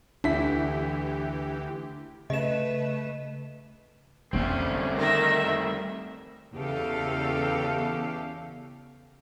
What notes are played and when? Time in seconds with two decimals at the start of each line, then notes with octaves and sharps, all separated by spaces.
0.24 D2 E3 D4 E4 G4 B6
2.30 C#3 A3 B4 D#5 E7
4.33 F2 D3 G3 A3 C4 C#4
4.94 D#3 E5
6.54 E2 C#3 G4 A4 F5